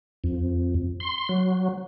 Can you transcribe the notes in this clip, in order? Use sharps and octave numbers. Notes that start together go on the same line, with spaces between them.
F2
C6
F#3